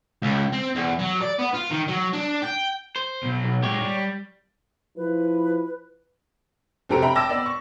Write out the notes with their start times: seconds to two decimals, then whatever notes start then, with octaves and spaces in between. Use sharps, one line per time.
0.22 C#2
0.53 C4
0.75 E2
0.99 F#3
1.21 D5
1.39 B3
1.54 F4
1.70 D#3
1.88 F#3
2.13 D4
2.42 G5
2.96 C5
3.23 B2 F#3
3.44 B1
3.63 A#2 G#3 G4 C#5
3.81 G3
4.97 F3 E4 B4
6.89 F1 C4 G4 A4 A#5 D7
7.02 E5 G5 A#5 B5
7.15 G5 A5 D6 E6 A#6 E7
7.29 B3 D5
7.46 C#6